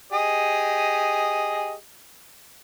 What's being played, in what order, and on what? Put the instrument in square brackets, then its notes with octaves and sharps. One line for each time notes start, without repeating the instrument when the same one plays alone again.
[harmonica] G4 G#4 D#5